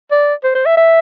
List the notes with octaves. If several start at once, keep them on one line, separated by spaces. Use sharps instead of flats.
D5
C5
C5
E5
E5